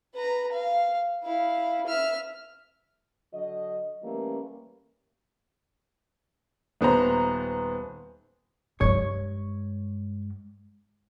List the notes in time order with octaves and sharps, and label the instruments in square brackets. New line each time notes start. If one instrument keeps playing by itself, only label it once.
[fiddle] B4 A#5
F5
E4 F5
E5 F6
[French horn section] D3 F#3 D#5
E3 G3 A3 A#3 C#4
[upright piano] D#1 B3 C5 A#5
[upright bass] G2 G#3 [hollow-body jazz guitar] C#5